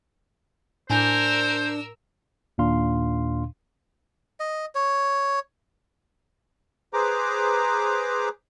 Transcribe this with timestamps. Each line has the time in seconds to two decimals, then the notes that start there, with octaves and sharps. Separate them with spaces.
0.90 A2 D4 A#4 C5 G#5 E6 G6
2.58 D#2 A#2 D4 F5 C6
4.40 D#5
4.75 C#5
6.93 G#4 B4 C5 A#5 D6